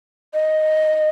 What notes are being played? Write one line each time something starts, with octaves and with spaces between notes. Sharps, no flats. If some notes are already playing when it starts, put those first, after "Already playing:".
D#5